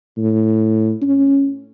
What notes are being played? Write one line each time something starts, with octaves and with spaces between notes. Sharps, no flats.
A2
C#4